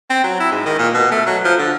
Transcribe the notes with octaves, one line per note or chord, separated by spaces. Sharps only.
C4
F#3
E4
G#2
D#3
A#2
B2
A3
F#3
F3
D3